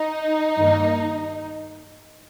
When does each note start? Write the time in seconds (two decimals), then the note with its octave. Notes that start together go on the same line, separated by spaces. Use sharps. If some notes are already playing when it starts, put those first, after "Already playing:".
Already playing: D#4
0.57 G2 D#3 A#3